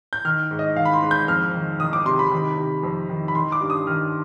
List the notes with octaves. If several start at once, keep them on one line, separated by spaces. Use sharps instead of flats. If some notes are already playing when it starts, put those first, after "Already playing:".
G6
D#3 F6
G#2
D#5
D#3 F5
B5
C6
G#2
G6
F2 F6
D#3
D#3 D#6
D6
C3 C6
B5
D#3
C3
F2
D#3
B5
D#3 C6
D6
G2
D#6
D#3 F6